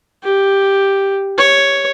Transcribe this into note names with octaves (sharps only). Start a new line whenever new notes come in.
G4
C#5